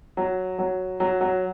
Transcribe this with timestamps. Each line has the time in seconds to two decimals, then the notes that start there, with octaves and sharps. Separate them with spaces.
0.17 F#3
0.59 F#3
1.00 F#3
1.21 F#3